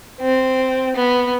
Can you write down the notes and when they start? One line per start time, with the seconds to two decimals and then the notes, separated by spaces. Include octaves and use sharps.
0.20 C4
0.96 B3